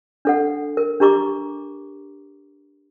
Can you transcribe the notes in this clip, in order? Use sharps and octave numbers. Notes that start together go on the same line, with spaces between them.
D4 A4 F#5
A#4
D4 G4 A#5 C#6 D6